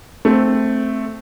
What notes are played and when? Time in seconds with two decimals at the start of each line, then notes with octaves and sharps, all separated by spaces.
0.25 A3 C4